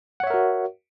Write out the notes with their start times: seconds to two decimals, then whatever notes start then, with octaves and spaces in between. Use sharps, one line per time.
0.20 F#5
0.24 C#5
0.27 E5
0.30 A#4
0.34 F#4